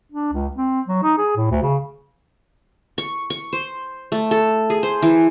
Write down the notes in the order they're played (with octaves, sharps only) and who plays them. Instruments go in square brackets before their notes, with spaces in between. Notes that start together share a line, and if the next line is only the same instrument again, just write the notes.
[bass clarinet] D4
C#2
C4
F#3
D#4
G#4
A2
D2
C#3
[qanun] C#6
C#6
C5
A3
A4
G#4
C5
E3